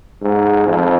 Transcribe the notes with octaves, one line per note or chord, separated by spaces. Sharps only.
G#2
F2